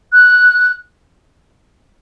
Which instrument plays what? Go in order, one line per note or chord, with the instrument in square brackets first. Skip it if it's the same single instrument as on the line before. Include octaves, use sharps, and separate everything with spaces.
[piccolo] F#6